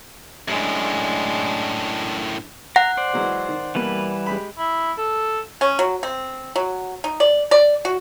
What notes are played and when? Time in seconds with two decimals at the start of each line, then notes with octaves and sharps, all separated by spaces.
0.48 F#2 A2 G#3 D4
2.76 F#5 A#5
2.97 C5 D5
3.13 E3 F#3 G#3
3.49 D#3
3.75 B2 E3 G3 A#3 B4
4.26 G#3 G4 B5
4.58 E4
4.98 A4
5.61 C#4
5.79 F#3
6.03 C4
6.56 F#3
7.04 D#4
7.20 D5
7.51 D5
7.85 F#4